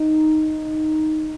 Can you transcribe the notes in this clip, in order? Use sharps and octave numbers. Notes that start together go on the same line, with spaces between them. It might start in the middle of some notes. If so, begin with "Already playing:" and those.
Already playing: D#4